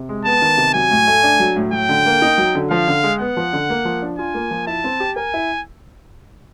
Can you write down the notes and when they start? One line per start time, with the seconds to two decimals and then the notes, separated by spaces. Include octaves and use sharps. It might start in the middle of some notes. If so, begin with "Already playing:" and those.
Already playing: C3
0.09 G#3
0.25 B3 A5
0.42 D#3
0.58 C3
0.74 F#3 G#5
0.91 A2
1.07 A3
1.23 D4
1.40 F#3
1.56 A2
1.72 F#3 G5
1.89 D3
2.06 A#3
2.22 D#4
2.38 F#3
2.55 D3
2.70 F3 F5
2.88 D3
3.03 G#3
3.20 B3 F#5
3.37 F3
3.53 D3
3.70 A#3
3.85 F3
4.02 D4
4.18 F4 G#5
4.35 A#3
4.51 F3
4.67 E4 A5
4.84 C4
5.00 G4
5.16 A#4 G#5
5.34 E4